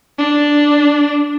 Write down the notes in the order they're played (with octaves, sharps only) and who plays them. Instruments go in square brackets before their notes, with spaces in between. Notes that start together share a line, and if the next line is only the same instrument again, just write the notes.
[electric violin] D4